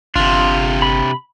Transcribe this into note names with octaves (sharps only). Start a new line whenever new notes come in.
G1 C3 D4 F4
B5